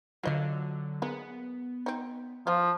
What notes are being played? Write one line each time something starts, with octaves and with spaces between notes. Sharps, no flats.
D3 F#3 F4 D#5 F5
G#3 A#3 B3
C4 D#4
F3 F4 C5 F5